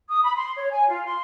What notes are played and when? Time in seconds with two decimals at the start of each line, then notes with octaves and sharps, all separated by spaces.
0.08 D#6
0.22 B5
0.36 C6
0.56 C#5
0.71 G#5
0.88 F4
1.05 C6